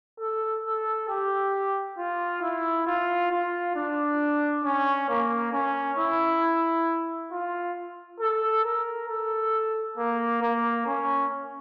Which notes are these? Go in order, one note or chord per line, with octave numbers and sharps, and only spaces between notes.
A4
A4
G4
F4
E4
F4
F4
D4
C#4
A#3
C#4
E4
F4
A4
A#4
A4
A#3
A#3
C#4